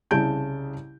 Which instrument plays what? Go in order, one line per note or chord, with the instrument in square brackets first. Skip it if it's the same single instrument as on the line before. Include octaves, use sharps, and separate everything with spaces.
[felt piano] C2 C#3 A5 G6 D7